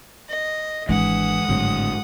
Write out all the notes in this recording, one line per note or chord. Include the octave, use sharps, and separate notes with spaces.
D#5
G#1 E3 G#3 D4 F#5 D#6
G#1 A2 D3 F#3